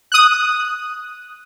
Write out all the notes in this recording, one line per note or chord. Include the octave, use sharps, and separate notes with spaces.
D#6 F#6